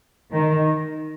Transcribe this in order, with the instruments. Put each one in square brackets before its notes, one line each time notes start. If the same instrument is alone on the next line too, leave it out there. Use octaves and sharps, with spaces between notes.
[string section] D#3